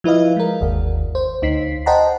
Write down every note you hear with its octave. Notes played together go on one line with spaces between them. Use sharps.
F3 E4 B4 D#5 F5
G#3 A#4
G1 D#2
C5
D2 D#4 B6 C7
C5 D#5 F#5 G5 A5 A#5